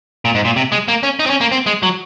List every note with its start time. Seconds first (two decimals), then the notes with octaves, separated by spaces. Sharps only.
0.25 A#2
0.35 G#2
0.45 A#2
0.56 C3
0.72 G#3
0.88 A#3
1.03 C#4
1.19 D#4
1.26 C4
1.30 C#4
1.41 A#3
1.52 C4
1.66 G#3
1.83 F#3